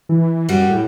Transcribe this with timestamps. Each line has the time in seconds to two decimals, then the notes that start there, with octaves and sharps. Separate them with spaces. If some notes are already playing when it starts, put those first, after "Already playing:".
0.09 E3
0.48 F#2 G3 F#4 G4
0.69 A2